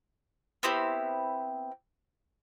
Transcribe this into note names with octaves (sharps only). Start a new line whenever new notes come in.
B3 C4 E4 G4